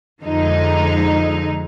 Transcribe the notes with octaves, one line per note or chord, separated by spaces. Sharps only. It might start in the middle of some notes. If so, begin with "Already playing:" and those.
F2 D3 F3 G#3 D#4